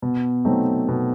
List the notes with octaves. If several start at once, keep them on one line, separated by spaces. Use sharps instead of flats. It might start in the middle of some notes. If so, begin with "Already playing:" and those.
B2
F#3 A3 C4 D#4
B2